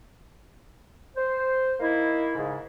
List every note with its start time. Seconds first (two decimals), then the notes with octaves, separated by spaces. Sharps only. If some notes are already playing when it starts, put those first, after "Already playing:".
1.16 C5
1.80 A#3 D#4 E4
2.36 G#2 C#3